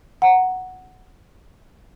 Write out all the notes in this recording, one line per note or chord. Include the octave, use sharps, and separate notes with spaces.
F#5 A#5